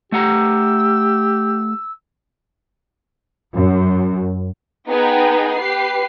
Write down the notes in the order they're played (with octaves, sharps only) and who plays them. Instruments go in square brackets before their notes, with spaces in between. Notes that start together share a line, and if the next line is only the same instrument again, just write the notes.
[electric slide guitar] A3 F#5 A#5 [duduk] G4 [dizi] E6
[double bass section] F#2
[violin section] B3 D#4 G#4 G5
G4 B4 C7